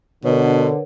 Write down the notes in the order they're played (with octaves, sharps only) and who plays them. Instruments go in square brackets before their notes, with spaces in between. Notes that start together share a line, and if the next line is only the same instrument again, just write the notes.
[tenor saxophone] B2 [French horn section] D3 [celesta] A#4 B4 C#5